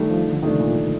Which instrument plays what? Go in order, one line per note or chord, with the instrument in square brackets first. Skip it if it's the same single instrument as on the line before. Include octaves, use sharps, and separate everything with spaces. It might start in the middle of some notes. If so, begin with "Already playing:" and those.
Already playing: [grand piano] D#3 A3 D4 [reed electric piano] G3
[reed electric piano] F3
D3
[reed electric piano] C3 [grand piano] D#3 A3 D4
[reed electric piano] A#2